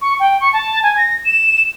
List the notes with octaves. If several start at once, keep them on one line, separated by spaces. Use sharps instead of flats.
C#6
G5
C#6
A5
G#5
A#6
E7